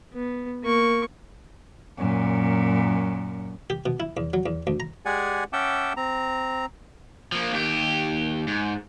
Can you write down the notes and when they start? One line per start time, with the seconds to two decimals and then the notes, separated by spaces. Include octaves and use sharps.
0.13 B3
0.63 A#3 C#6
1.98 F#2 A#2
3.70 G4
3.86 B2
4.00 E4
4.17 E2
4.34 F#3
4.46 E2
4.67 D2
4.80 A#5
5.05 G#3 G4 G#4 D5 F#5 G#5
5.53 C#4 E5 F#5 G5 A5 D6
5.97 C4 A#5
7.32 F3 A#3
7.53 D#2 G4
8.48 G#2